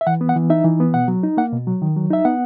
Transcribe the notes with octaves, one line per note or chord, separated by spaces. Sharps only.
E5
E3 F#5
B3
F#5
E3
D#4 E5
E3
B3
B2 F#5
F#3
D#4
A#3 F#5
B2
F#3
D#3
F#3
D#4 E5
B3 F#5